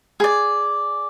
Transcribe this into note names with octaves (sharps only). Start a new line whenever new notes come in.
G#4 D5